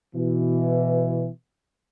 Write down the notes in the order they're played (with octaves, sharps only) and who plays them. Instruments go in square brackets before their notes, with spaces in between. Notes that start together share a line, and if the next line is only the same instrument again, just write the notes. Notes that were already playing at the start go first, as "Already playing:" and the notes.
[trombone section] B2 E3